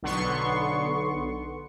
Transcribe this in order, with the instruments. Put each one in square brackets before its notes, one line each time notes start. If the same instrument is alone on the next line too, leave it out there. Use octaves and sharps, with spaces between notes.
[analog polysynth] B1 D3 B3 C6 C#6